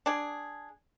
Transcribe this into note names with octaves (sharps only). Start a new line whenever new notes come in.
D4 G#4